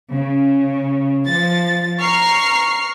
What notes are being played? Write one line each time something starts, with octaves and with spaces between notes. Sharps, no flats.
C#3
F3 A6
A#5 C#6 F6 C7